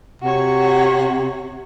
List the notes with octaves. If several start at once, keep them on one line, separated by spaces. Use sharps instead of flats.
C3 F#4 C#5